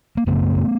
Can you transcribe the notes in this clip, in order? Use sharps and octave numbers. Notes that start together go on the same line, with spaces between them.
A#3
F#2 C#3 A3 B3